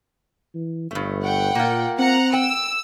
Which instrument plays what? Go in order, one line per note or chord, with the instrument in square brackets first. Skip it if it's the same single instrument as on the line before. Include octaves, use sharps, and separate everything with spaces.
[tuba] E3
[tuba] G1 [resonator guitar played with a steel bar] G2 A3
[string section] F#5 G5
[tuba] A#2 [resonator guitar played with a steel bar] A#3 F4
[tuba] C4 [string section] F#5 A#5
[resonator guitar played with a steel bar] G5 [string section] E6